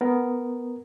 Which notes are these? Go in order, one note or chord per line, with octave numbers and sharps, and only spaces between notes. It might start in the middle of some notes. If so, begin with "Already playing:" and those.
B3 A#4